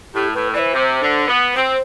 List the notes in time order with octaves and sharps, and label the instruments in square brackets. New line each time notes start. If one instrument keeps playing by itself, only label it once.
[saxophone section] A2 [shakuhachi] G4
[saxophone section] A2 [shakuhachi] B4
[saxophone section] E3 [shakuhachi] D5
[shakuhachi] C5
[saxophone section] C3
D3
B3
[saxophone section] C4 [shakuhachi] C5